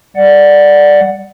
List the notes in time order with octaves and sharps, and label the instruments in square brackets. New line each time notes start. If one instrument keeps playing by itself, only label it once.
[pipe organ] G3 D5 F#5